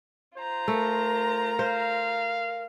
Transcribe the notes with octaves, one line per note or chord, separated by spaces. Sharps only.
F4 C5 A#5
A3 A#4
C5 F5